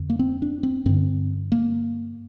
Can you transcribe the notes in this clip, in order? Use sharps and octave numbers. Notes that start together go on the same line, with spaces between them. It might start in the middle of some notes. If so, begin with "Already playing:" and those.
Already playing: F2 D3
A#3
C4
D4
C4
G2 D3 C4
A#3